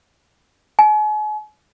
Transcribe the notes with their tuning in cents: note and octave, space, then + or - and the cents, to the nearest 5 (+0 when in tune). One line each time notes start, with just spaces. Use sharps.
G#5 +40